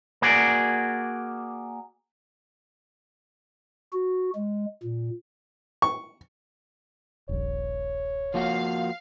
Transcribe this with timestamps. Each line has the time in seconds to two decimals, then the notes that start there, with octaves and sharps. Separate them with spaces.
0.22 A#3 F#4 G#4 D5
3.93 F#4
4.35 G#3
4.83 A#2
5.82 C#6
7.29 D#1 A#1 C#5
8.34 F3 A#3 F#4 F5